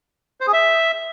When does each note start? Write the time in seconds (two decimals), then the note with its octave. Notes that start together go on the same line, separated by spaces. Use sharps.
0.41 C5
0.47 G#4
0.53 E5